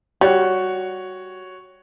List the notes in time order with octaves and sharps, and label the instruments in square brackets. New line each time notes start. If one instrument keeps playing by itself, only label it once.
[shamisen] G3 [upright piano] F#4 C#5